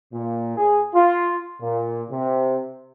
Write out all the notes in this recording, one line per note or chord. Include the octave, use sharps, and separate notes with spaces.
A#2
G#4
F4
A#2
C3